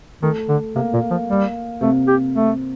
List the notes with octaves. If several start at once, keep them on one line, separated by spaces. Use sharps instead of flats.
D#3 A3
D3
C3 A#3
A#2
F3
G3
C3 A3
G4
A3